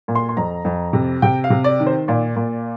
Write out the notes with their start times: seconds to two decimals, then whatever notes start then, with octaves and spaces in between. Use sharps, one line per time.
0.08 A#2
0.15 C6
0.29 C6
0.37 F2 A#5
0.65 F2
0.93 C3
1.22 C3 G5
1.44 F5
1.50 C3
1.64 D5
1.80 D#3
1.87 C5
2.08 A#2 D5
2.36 A#2